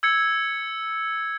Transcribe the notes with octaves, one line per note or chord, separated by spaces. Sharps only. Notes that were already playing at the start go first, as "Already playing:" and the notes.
E6 G#6 C#7